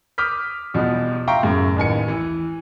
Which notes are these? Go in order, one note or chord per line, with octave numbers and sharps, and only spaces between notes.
D6 D#6 F6 G6 B6
E2 B2 F3 G3
E5 F5 G5 A#5 C6 C#6
F#2 A2 C#3
A1 D#2 G#5 C#7
E3